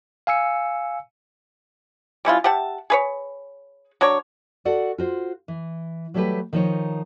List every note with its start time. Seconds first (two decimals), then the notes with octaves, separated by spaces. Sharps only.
0.27 F5 G#5 E6 C#7
2.25 G3 C#4 E4 F4
2.44 G4 E5 F#5 A5
2.90 G#4 B4 C#5
4.01 F#3 D4 C#5
4.65 F#4 A4 D5 F#5
4.98 F4 F#4 C5
5.48 E3
6.14 F#3 G3 A3 B3 G4 B4
6.53 D#3 F3 D#4 C5 C#5